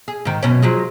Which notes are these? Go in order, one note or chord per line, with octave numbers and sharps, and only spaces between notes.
G#4
G#2 D#3
F#2 B2 C#4
F3 F#3 G#3